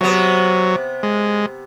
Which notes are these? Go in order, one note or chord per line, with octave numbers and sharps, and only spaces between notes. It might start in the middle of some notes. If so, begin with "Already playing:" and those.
C3 F#3 B3
G#3